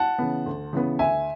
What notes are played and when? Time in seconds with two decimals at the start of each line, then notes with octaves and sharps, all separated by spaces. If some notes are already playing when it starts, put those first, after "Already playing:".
Already playing: F#5 A5
0.19 C#3 E3 B3
0.46 D2
0.73 C#3 E3 B3
0.99 D2 E5 G#5